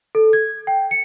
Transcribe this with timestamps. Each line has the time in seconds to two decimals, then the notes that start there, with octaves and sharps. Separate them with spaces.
0.15 A4
0.33 G#6
0.67 G5
0.91 C#7